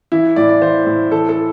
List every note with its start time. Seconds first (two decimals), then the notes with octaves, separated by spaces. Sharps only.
0.12 E3 E4
0.36 A2 D5
0.49 D5
0.62 E3 C5
0.86 A2
1.12 E3 A4
1.29 A4